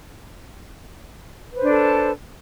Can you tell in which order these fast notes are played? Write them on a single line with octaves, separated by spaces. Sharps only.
B4 C5 D4 A4